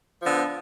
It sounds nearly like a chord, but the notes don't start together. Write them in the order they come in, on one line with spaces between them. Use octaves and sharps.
F3 B3 D3